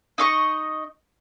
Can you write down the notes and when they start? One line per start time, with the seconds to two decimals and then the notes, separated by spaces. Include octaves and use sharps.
0.18 D#4 D#5 C#6